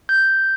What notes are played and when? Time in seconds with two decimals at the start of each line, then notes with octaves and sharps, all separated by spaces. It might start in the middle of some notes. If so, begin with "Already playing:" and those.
0.09 G6